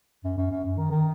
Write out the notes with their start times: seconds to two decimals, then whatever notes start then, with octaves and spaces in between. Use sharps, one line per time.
0.24 F#2
0.37 F#2
0.51 F#2
0.64 F#2
0.77 D#3
0.91 D#3